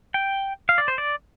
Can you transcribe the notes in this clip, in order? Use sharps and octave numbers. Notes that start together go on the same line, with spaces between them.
G5
F5
D5
C5
D5